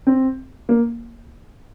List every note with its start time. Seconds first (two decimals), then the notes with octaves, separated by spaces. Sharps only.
0.07 C4
0.69 A#3